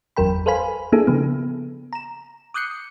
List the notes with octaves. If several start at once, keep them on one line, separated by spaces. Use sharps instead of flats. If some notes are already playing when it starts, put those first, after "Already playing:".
G1 E2 F#3 A#4 G5 B5
A4 B4 C5 F5 G#5 B5
A#3 B3 D4 E4 G#4 A4
C#3 F3 B3
A#5 E7
D6 D#6 F#6 G6 C7 C#7